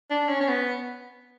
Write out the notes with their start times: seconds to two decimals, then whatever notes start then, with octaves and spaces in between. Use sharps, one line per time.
0.10 D4
0.29 C#4
0.41 C#4
0.48 B3